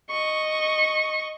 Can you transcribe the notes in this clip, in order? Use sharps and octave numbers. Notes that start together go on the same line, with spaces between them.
D#5 C#6